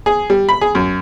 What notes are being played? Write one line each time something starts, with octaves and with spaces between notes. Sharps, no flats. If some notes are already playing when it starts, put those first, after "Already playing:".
G#4
G3
B5
G#4
F#2